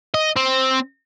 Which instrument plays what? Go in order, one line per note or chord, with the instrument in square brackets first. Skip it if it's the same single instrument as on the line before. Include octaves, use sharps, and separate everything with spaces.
[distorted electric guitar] D#5
C4